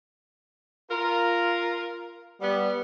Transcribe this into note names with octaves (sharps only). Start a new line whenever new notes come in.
F4 A#4
G3 B3